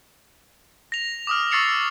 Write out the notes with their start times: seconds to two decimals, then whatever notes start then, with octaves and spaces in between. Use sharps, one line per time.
0.92 A#6 F7
1.27 D6 D#6 F6
1.51 C#6 E6 A6 C7 C#7 F7